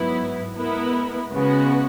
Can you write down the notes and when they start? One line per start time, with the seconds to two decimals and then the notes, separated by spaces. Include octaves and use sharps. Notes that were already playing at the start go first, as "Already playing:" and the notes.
Already playing: G#2 F#3 B3 E4
0.55 G#3 B3 E4 A#4
1.31 C#3 G#3 B3 F#4